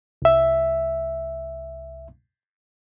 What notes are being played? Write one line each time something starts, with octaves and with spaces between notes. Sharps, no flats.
C2 E5